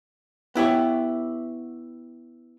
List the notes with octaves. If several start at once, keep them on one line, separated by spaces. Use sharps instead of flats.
B3 E4 G4 C#5